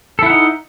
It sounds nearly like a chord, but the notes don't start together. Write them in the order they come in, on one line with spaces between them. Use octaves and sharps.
A4 E4 F#5 D#4